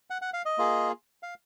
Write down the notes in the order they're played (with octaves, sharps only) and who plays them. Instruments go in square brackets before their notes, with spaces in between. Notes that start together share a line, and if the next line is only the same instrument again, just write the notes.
[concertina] F#5
F#5
F5
D#5
A#3 F4 G#4
F5